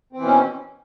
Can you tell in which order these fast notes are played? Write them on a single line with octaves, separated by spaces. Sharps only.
C4 E3 B2 C#4